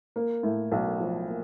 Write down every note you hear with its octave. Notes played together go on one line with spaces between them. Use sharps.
A#3
A2
B1
F3
A#3